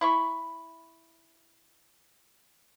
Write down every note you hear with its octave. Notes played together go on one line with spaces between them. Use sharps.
E4 B5 C#6